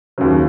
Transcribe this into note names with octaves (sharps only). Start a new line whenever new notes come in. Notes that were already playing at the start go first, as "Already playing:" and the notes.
D#2 C#3 F#3